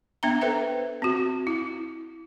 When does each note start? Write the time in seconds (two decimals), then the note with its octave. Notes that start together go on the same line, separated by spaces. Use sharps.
0.23 B3 D4 E5 G5 A#5
0.41 A4 B4 C5 E5 G5
1.02 C4 F#4
1.47 E4